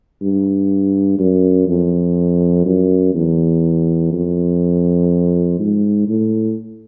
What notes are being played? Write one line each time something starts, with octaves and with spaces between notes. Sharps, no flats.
G2
F#2
F2
F#2
E2
F2
G#2
A2